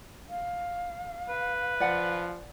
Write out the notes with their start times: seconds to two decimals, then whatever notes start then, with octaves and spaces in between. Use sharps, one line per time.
0.29 F5
1.29 B4
1.80 F3 D5 F#5 G#5